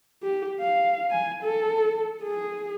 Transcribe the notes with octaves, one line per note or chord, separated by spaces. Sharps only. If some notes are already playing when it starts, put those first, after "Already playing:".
G4
F5
G#5
A4
G#4